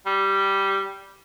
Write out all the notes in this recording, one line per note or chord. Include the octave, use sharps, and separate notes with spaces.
G3